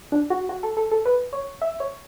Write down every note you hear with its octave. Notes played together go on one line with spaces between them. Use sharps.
D4
F#4
F#4
A4
A4
A4
B4
C#5
E5
C#5